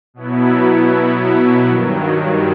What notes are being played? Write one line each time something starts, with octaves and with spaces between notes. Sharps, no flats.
B2 F#3 B3 E4
G2 D#3 F#3